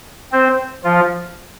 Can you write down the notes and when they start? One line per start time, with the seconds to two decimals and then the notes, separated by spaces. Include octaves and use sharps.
0.32 C4 C5
0.84 F3 F4